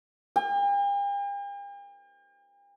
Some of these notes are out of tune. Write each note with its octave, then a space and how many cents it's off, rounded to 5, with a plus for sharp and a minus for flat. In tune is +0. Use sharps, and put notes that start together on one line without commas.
G5 +45